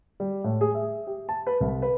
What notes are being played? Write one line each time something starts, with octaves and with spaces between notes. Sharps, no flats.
G3
A2
G#4
E5
G4
A5
B4
C2
B4